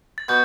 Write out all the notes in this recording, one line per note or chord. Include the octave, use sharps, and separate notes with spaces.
A6
B2 B3 G6